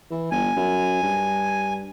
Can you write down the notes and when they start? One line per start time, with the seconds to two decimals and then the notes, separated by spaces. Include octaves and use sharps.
0.11 E3
0.31 G1 G#5
0.56 F#2
1.03 G2